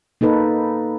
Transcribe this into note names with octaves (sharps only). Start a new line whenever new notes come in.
A#3 D#4 A4 B4